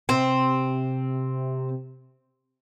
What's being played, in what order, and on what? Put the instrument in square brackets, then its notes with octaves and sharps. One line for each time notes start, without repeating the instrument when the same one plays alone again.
[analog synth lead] C3 [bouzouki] C4